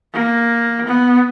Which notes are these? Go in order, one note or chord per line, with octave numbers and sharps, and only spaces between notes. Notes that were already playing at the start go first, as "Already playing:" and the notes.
A#3
B3